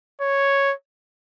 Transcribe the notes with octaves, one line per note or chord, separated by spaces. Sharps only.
C#5